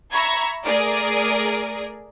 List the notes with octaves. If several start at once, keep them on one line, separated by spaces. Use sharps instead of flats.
E5 A#5 B5 C#6 G#6
A3 G#4 A#4 D5